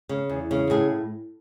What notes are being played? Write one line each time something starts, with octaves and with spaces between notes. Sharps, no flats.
C#3
E2
C#3
A2 G#4